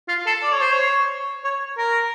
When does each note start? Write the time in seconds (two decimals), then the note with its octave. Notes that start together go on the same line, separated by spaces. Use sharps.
0.08 F4
0.27 A4
0.43 D5
0.52 C#5
0.61 C5
0.72 C#5
1.44 C#5
1.78 A#4